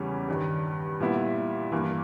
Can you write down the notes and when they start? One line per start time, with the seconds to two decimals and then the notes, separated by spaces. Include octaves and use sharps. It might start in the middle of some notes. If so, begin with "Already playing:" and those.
Already playing: E2 C#3 E3 G3 C#4
0.28 G2 D#3 G3
1.00 A#2 G3 B3 E4
1.72 G2 E3 A#3